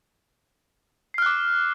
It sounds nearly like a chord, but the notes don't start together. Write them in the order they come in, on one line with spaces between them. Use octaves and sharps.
C7 F6 F#6 D6